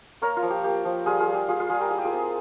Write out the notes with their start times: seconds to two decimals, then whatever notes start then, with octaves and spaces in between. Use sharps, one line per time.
0.22 A#3 A#4 C#5
0.37 F4
0.43 F3
0.50 G4
0.64 A#3 G4
0.85 F3
1.06 G3 F4 G#4
1.20 F4 G#4
1.28 G3
1.34 G4
1.48 G3 F4 G#4
1.60 F4 G#4
1.70 G3 F4 G#4
1.81 G4 A#4
1.90 E4 G#4
1.98 G4
2.05 F4 G#4
2.13 C4